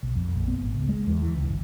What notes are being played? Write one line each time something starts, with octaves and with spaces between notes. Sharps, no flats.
B1
F2
A#1
B3
G#1
C#2
G#3
E2
E3
C#2
G1